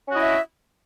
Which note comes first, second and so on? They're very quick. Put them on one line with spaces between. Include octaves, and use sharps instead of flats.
C#4 F#4 D#5 E4 E5